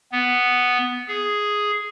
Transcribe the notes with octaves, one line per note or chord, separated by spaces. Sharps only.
B3
G#4